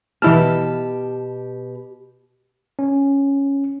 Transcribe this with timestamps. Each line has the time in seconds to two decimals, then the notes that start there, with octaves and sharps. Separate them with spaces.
0.22 B2 E3 E4 G4 A5 F6
2.79 C#4